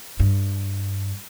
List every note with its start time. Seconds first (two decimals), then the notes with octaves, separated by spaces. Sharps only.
0.20 G2